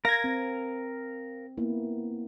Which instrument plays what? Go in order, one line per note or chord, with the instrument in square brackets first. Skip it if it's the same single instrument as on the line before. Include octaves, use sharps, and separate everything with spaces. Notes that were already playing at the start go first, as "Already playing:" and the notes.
[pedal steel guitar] A#4 F5 [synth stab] G#6 A#6
[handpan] C4
A#3 B3 E4